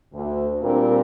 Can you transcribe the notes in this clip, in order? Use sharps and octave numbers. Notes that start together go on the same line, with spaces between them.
D2
A#2 G3 C4 D4 A#4